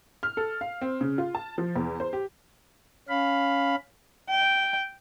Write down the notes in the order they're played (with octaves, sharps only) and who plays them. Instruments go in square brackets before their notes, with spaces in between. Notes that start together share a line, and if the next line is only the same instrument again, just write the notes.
[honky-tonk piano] F6
A4
F5
C4
C#3
F4
A5
F3
E2
C5
G4
[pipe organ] C#4 F5 B5
[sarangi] G5